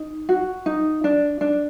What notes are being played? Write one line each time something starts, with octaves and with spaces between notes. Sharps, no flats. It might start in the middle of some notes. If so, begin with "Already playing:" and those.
Already playing: D#4
F#4
D#4
D4
D4